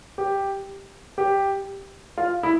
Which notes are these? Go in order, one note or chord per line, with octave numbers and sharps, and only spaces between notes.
G4
G4
F4
E4